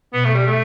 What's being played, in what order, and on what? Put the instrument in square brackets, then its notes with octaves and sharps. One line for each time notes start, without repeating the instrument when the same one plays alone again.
[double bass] B2 [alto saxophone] B3
[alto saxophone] A3
G3
A3